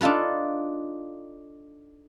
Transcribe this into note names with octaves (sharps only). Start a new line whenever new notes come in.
D4 D#4 F4 A4 B4